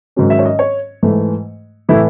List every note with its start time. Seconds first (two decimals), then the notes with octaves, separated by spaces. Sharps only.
0.16 G#2 D#3 F#3 C#4
0.30 E5
0.39 C#5
0.45 D#5
0.59 C#5
1.03 G#2 E3 A3
1.89 A2 E3 A3 E4